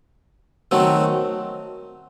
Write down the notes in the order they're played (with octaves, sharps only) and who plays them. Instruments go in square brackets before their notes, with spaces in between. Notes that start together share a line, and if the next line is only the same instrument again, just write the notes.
[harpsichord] D#3 F#3 A3 C4